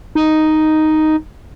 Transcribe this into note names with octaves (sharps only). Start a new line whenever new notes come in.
D#4